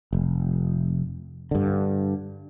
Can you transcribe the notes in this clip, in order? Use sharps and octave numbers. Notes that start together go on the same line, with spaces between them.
F1
G2 D3